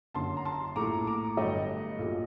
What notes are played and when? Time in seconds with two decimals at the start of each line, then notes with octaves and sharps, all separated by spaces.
0.14 F#1 F#2 D3 A5 C6
0.37 A#5
0.45 A5 C6
0.76 A#1 A2 A3 A#5 D6
1.07 A#5 D6
1.37 G1 G2 F#3 A3 D#5 G5
1.99 A#1 A#2 F#3 A3